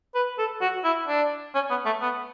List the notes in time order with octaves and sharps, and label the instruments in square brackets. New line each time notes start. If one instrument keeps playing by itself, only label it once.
[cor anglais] B4
A4
F#4
E4
D4
C#4
B3
A3
B3